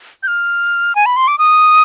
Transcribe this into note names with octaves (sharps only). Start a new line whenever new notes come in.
G6
F6
G#5
B5
C6
D6
D#6